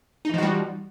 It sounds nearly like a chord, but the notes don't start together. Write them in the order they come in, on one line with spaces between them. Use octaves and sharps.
D#4 E3 F3 F#4 G3